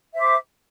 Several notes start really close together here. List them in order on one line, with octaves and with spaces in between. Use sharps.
E5 C5 D6